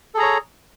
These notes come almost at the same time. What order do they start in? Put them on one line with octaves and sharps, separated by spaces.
A4 G#4 A#5 C#5